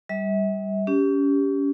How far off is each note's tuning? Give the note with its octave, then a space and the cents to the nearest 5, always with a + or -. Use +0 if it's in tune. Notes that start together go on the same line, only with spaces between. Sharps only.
G3 +0 E5 -35
C#4 +30 G4 +0